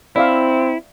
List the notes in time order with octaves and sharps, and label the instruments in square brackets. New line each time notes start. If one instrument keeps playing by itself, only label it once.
[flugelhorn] C4 [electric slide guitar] E4 [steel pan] D5 E5 F5